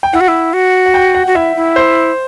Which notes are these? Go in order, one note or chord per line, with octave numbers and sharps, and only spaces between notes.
G5
E4 F#5
F#4
E4
F#4
F#5
G5
F#5
F#4
E4 E5
E4
C5